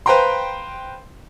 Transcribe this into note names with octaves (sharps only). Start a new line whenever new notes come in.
B4 C5 F5 G5 A#5 C6